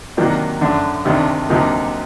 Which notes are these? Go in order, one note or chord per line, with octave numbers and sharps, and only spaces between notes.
C3 D#3 F#3 A#3 D4
F#2 D3 A3 D4
D2 C3 D#3 A3 D4
D2 C3 F#3 A#3 D#4